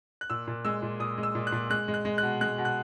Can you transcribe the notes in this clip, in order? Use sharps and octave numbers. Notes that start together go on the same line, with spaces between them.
F#6
A#2 E6
A#2
G#3 E6
A#2
A#2 D#6
G#3
E6
A#2
F#6
A#2
G#3 F#6
G#3
F#6
G#3
B2 F#6
G#3 F#6
B2
F#6